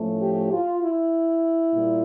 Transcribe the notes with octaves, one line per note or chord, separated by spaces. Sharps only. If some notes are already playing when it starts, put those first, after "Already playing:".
Already playing: A2 F3 A3 C#4
G4
F4
E4
A#2 G3